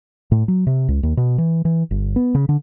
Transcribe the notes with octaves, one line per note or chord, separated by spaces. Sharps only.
A2
F#3
C3
C#2
D#2
B2
E3
E3
G1
B3
C#3
D3